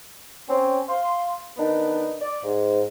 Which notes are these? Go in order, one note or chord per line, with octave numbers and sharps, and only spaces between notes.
C4 C#4
F5 C6
D#3 B3 D4 D#4
D5
G#2